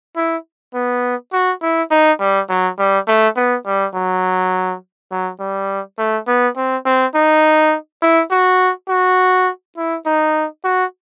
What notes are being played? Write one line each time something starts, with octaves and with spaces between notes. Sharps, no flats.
E4
B3
F#4
E4
D#4
G3
F#3
G3
A3
B3
G3
F#3
F#3
G3
A3
B3
C4
C4
D#4
E4
F#4
F#4
E4
D#4
F#4